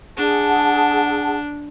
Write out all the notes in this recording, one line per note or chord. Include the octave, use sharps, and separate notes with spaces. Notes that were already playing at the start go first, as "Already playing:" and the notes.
D4 G#4 F#5 A5